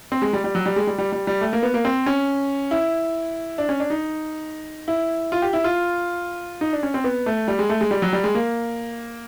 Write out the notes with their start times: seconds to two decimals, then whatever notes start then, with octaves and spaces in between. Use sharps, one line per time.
0.12 C4
0.22 G#3
0.33 G3
0.44 G3
0.55 F#3
0.66 G3
0.76 G#3
0.87 G3
0.98 G3
1.12 G3
1.27 G3
1.41 A3
1.53 A#3
1.63 B3
1.74 A#3
1.85 C4
2.06 C#4
2.71 E4
3.58 D4
3.69 C#4
3.80 D4
3.90 D#4
4.88 E4
5.32 F4
5.42 G4
5.53 E4
5.64 F4
6.61 D#4
6.73 D4
6.83 C#4
6.94 C4
7.04 B3
7.26 A3
7.48 G3
7.59 G#3
7.69 A3
7.81 G#3
7.91 G3
8.02 F#3
8.13 G3
8.24 G#3
8.35 A#3